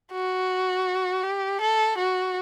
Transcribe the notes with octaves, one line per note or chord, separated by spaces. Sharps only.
F#4
G4
A4
F#4